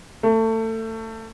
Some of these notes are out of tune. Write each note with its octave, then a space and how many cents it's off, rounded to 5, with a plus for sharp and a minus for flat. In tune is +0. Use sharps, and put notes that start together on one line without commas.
A3 +25